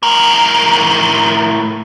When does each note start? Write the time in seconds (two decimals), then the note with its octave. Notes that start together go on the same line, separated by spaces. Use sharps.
0.03 A2 A#4